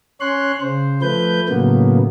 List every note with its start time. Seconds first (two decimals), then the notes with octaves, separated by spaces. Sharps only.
0.21 C#4 C#5 C6 F#6
0.61 C#3 C5
1.02 F3 A3 B4 G6
1.49 A2 C#3 F#3 A#3 B3